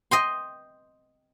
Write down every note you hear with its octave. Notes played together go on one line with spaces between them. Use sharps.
D#5 G5 C6